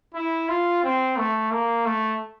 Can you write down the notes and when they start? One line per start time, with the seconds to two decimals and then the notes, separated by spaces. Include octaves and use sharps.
0.15 E4
0.49 F4
0.83 C4
1.17 A3
1.51 A#3
1.86 A3